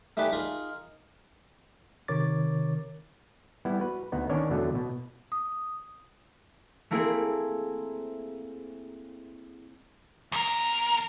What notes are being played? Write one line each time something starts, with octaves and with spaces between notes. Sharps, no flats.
A3 D#4 G4 B4 D5 G#5
D#4 F4 G#4 A#4
C3 D#3 A#4 C#5 D6 A6
G3 B3 E4
F#4 B4
D2 B3 D#4
D#3 C#4 D4 C#5 D5
E2 B2 D3 F#3 A3
B2
D#6
A3 A#3 C4 E4 G#4
E2 A#4